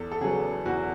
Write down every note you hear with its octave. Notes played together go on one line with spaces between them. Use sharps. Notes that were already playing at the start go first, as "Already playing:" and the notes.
Already playing: E2 A4
A4
C#3 F#3 B3 G#4
E2 F#4